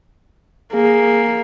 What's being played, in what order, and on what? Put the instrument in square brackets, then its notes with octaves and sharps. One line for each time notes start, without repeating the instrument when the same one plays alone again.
[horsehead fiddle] A#3 [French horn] G#4